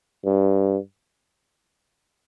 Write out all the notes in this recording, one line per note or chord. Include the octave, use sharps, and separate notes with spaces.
G2